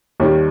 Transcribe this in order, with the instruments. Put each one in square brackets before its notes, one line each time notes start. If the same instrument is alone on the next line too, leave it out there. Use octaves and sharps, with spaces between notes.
[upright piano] D#2 D#3 G3